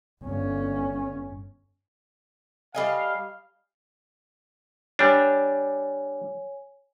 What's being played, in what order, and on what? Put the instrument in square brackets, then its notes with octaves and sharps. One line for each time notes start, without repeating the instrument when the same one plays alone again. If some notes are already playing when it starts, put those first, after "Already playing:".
[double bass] G1 C#4
[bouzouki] G3 D#5 G#5 [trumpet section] F5
[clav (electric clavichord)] G3 D4 [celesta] C#5 G#5